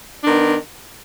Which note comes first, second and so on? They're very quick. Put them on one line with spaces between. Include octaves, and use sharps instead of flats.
D4 D#3 B3